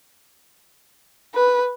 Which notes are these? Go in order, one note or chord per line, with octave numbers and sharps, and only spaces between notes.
B4